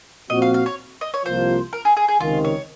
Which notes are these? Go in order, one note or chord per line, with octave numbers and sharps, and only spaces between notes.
A#2 F3 C4 F#4 D#5
F5
F5
C#5
D#5
C#5
C2 C3 F3 A#3 F4 C5
A#4
G#4
G#4
G#4
C#2 C3 D#3 F4
C#5